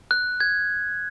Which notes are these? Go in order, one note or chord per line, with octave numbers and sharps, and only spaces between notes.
F#6
G#6